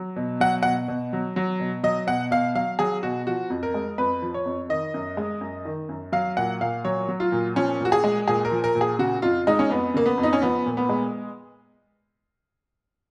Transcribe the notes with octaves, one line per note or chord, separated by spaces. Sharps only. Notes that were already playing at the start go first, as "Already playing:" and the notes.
Already playing: F#3
B2
F#3 F#5
B2 F#5
B2
F#3
F#3
B2
F#3 D#5
B2 F#5
B2 F5
F#3 F5
F#3 G#4
B2 F#4
F3 F#4
F2
A#4
G#3
F2 B4
F3
C#5
F2
D#3 D#5
F#2
G#3
F#2
D#3
F#2
F#3 F5
A#2 F#5
A#2 F5
F#3 C#5
F#3
F4
A#2
F3 C#4
A#2
F#4
G#4
G#3
A#2 G#4
A#4
F3
A#4
A#2
G#4
C#3 F#4
F2 F4
G#3 D#4
C#4
F2 B3
C#3 A#3
B3
F2
D#4
C#4
F3 B3
A#2
B3
G#3